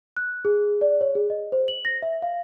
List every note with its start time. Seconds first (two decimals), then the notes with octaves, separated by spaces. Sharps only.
0.17 F#6
0.45 G#4
0.81 D5
1.01 C#5
1.15 G#4
1.30 D#5
1.52 C5
1.68 F#7
1.85 A#6
2.02 E5
2.22 F5